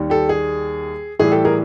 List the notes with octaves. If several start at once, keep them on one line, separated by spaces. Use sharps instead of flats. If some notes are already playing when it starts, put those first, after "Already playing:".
Already playing: D#2 D#3 G3
G4 A4
G#4
A2 E3 G3 G#4
G4 A4
G#4 A#4